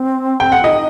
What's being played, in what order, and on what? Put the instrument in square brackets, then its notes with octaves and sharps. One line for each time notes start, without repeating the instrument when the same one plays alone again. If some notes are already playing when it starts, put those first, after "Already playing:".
Already playing: [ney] C4
[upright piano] G5
F#5
[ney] D#4 F4 [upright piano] D#5